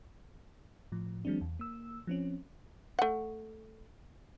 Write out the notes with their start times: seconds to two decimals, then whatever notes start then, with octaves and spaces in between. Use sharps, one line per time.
0.92 A2 F3
1.25 E3 F#3 G#3 C4 D4
1.41 E2
1.59 A#3 E6
2.07 F3 C4 C#4
2.99 A3 F#5